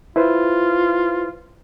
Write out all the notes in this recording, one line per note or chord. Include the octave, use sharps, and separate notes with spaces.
E4 F4 B4 C5